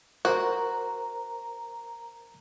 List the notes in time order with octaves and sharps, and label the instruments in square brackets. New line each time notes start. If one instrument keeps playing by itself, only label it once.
[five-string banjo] F#4 [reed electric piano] A#4 C5 [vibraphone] A#5